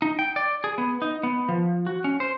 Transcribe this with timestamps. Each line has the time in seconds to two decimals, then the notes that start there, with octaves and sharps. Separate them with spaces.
0.02 D#4
0.19 G5
0.36 D5
0.64 G#4
0.78 B3
1.02 D#4
1.23 B3
1.49 F3
1.87 F#4
2.04 C#4
2.20 C5